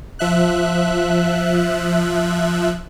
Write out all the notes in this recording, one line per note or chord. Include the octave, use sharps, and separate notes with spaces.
F3 E5 F#6